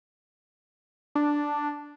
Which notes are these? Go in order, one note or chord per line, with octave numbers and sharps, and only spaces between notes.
D4